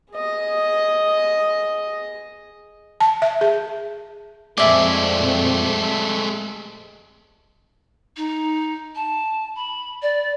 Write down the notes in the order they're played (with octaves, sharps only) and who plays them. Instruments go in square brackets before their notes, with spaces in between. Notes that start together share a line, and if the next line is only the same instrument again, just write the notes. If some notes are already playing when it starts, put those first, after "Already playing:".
[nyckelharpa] G#4 D#5
[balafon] A5
E5
G#4
[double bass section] F2 A#2 C4 [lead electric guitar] G#3 A3 [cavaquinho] D5 E5 G#5
[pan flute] D#4
A5
B5
D5